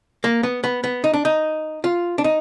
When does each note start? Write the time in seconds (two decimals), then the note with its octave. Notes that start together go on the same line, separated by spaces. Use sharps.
0.24 A#3
0.43 B3
0.64 B3
0.84 B3
1.04 D#4
1.14 D4
1.25 D#4
1.84 F4
2.18 D4
2.24 D#4